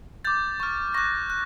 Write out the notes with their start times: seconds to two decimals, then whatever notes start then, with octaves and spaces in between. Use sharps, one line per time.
0.25 D6 G6 A6
0.60 C#6 F6
0.94 C#6 F#6 A#6
1.30 F#6